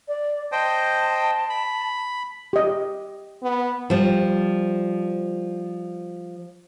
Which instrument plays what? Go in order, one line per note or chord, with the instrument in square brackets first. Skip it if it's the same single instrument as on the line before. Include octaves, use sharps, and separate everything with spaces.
[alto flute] D5
[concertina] C5 D#5 G5 [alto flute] A5
[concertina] B5
[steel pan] G4 D#5
[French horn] B3
[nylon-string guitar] F3 G3